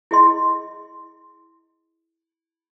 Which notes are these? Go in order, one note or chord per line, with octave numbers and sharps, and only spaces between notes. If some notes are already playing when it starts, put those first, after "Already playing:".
E4 G#4 D#5 C6